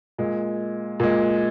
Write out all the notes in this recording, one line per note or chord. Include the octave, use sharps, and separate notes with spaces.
A#2 G#3
A#2 G#3